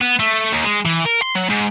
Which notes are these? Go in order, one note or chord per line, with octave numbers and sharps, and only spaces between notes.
B3
A3
D#2
G#3
E3
A#4
C6
F#3
G#2